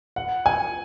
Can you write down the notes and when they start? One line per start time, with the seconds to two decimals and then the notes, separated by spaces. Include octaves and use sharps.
0.16 F#5
0.46 G#5